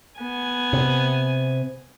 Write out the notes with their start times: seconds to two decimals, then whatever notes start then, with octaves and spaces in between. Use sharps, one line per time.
0.20 B3 G#5
0.73 C3